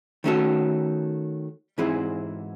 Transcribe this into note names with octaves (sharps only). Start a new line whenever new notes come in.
D#3 A3 C#4 F#4 A4
G#2 E3 C4 E4 G#4